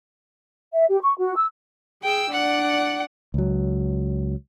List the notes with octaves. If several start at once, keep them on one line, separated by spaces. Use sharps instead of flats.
E5
G4
C#6
F#4
E6
G#4 G5 E6
D4 D5 F#5
C#2 F#3